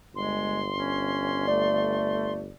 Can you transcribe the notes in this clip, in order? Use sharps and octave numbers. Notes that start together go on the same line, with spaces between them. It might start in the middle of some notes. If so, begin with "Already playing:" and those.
G1 G#3 C6
C#4
A3 D5